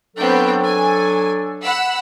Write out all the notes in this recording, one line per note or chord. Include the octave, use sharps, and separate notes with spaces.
F#3 B3 C4 D4 A4 G5
G#5
F#5 B5 E6